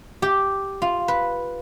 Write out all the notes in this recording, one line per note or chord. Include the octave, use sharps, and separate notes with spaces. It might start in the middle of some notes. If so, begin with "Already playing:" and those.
G4
F4
B4